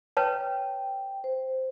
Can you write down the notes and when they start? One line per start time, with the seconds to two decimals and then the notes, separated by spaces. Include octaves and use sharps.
0.17 B4 C#5 G5 A5
1.24 C5